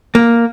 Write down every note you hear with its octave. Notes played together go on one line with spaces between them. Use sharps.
A#3